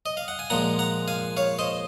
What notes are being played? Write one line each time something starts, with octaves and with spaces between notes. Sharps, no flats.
D#5
F5
F#5
G#5
A#2 F3 G#3 F#5 A#5
F#5 A#5
F5 G#5
C#5 F5
C5 D#5